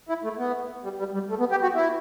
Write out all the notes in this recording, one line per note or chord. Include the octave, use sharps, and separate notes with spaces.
E4
A3
B3
G3
G3
G3
A3
B3
G4
F#4
E4